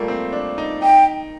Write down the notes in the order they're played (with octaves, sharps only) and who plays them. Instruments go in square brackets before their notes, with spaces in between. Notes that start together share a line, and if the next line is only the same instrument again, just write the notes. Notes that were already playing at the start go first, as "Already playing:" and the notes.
Already playing: [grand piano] F3 G3 A3 A#3
C4
D4
D#4
[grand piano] D#4 [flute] G5